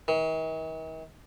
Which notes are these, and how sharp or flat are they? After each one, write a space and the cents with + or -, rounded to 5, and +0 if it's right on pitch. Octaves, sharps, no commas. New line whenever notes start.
D#3 +45